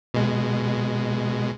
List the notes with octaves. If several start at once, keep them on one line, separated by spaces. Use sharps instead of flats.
B2 G#3